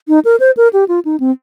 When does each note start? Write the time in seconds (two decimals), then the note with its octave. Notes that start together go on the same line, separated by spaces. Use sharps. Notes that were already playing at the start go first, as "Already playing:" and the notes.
0.08 D#4
0.25 A#4
0.40 C5
0.57 A#4
0.73 G4
0.88 F4
1.05 D#4
1.20 C4